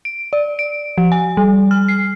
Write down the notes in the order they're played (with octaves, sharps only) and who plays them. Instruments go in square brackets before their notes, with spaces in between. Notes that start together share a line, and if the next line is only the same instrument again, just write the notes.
[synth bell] D7
D5
D7
F3
G#5
G3
F6
C7